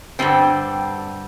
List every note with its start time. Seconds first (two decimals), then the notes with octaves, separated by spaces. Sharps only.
0.19 G2 D3 G3 C4